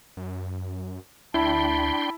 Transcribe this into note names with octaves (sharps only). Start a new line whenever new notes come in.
F#2
D2 D4 E4 G5 A5 B5 C6